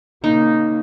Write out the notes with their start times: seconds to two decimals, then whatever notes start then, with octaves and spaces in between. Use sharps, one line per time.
0.24 C#3 A#3 D#4